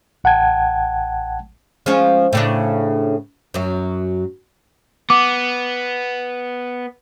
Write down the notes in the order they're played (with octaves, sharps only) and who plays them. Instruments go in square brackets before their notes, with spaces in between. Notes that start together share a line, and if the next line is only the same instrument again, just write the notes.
[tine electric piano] A1 F#5 G5 A5 G#6
[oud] F3 G#3 C#4
A2 C#3 D4
F#2 F#3
[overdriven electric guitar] B3 [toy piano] D6